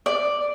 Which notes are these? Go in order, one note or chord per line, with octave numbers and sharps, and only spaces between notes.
D5